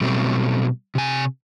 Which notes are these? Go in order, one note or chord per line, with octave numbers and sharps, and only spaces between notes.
B2 F#3 G3 A3 C4
C3 G#5